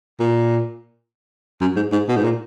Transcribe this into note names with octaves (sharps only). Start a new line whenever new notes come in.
A#2
F#2
G#2
G#2
B2
G#2
A#2